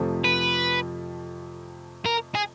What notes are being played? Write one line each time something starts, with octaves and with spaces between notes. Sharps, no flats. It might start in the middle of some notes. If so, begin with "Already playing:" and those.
Already playing: F2 C3 F3 A3
B4
A#4
G#4